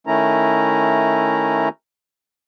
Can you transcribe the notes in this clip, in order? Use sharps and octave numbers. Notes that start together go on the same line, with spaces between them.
D#3 A3 C#4 E4 A#5